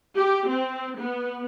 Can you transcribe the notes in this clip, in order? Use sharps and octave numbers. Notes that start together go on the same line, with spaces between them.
G4
C4
B3